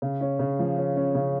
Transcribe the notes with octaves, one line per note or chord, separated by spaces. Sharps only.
C#3
C#4
C#3
F3
C#4
C#4
C#3